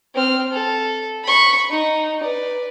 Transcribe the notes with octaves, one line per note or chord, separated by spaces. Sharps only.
C4 F6
A4
B5 C#6
D#4
B4 D5